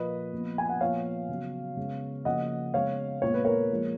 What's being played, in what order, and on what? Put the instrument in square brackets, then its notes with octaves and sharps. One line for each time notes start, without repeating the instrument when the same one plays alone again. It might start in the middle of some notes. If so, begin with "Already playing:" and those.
Already playing: [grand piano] A#2 F3 A#3 B4 D#5
A#2 F3 B3
G#5
F#5
A#2 F3 B3 C#5 F5
C#3 F#3 B3
C#3 G#3 B3
C#3 F3 A#3 D#5 F#5
C#3 G#3 B3 C#5 F5
A#2 G#3 B3 C#5
B4
A#4 C#5
A#2 F3 G#3